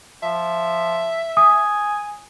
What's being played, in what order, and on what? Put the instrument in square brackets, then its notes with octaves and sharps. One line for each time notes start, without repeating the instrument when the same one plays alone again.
[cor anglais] F3 [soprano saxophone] E5
[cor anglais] G#5 [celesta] D#6